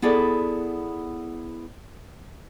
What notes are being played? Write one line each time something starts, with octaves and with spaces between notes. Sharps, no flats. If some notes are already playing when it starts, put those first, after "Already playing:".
B3 E4 G#4 A4 D5